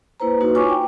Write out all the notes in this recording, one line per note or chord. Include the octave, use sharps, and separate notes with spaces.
A#3 E4 B4 C5 A#5
A#3 D#4 F#4 B4
E4 F4 C#5 G#5 C#6 D6
G5